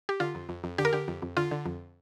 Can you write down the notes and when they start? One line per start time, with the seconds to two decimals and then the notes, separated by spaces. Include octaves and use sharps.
0.09 G4
0.20 D3 F4
0.35 F2
0.49 F2
0.64 F2
0.78 D3 G4
0.85 A#4
0.93 D3 G4
1.08 F2
1.22 F2
1.37 D3 F4
1.51 D3
1.66 F2